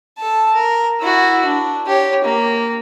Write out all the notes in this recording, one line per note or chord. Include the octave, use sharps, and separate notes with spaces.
A4 A5
A#4
E4 F#4
D4
G4 C#5
A#3